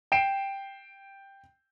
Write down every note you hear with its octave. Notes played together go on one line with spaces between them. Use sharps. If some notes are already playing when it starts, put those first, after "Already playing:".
G5 C7 D7 E7